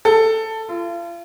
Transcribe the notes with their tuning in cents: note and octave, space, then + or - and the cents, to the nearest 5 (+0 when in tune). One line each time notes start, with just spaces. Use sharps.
A4 +10
F4 -40